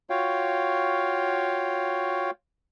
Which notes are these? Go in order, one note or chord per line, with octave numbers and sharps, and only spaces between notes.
F4 F#4 C#5 F5 G5